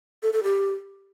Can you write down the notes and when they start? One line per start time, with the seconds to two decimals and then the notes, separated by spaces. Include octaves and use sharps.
0.23 A4
0.33 A4
0.43 G4